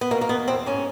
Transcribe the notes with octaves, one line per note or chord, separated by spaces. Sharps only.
B3
B2 A#3
A#3
E2 B3
E2 C4
G#2 C#4